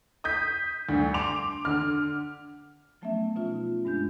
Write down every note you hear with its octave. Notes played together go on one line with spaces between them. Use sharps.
D#6 G6 B6
D2 G2
C6 D6 F7
D3 F6
F3 F#3 A3 B3 C#4 E5
B2 C#4 D#4 F4
G2 G#3 D4 G6